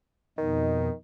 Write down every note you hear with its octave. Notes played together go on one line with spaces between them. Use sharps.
F2 B2 D#3 D#4